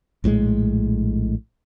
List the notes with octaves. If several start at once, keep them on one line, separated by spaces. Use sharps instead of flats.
A#1 A2 D#3 G#3